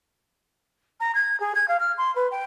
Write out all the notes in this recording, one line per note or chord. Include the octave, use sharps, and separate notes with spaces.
A#5
G#6
G#4
G#6
F5
F6
C6
B4
G5